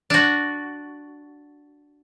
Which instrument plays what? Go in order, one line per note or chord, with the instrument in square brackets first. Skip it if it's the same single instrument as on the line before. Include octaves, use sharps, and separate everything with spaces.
[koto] D4 F#4